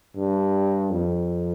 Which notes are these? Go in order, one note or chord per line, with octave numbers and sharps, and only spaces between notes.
G2
F2